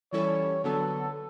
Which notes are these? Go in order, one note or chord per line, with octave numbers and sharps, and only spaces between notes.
E3 G3 C#4 E4 A4 C#5
D3 F#3 B3 A4